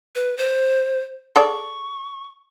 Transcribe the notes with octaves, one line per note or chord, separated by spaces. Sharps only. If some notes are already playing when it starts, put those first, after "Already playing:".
B4
C5
G#4 A4 D5 C#6